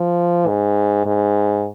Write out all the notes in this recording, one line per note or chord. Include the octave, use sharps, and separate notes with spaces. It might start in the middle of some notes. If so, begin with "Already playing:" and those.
Already playing: F3
G#2
G#2